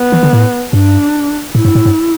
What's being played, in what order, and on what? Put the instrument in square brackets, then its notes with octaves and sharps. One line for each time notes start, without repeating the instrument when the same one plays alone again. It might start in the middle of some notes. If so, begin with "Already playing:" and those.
Already playing: [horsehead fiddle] B3
[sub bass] E3
D3
A2
[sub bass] G2 [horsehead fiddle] D4
[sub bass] A2 [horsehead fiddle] E4
[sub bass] G2
A2
G2